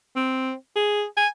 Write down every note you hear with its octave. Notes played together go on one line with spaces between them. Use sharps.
C4
G#4
G#5